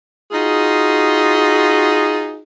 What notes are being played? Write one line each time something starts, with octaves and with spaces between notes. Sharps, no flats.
D#4 F4 F#4 G#4